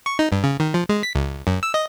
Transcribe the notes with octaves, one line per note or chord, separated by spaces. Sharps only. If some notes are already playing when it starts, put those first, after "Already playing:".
C#6
D#4
G2
C#3
D#3
F3
G#3
B6
C#2
F#2
E6
D#5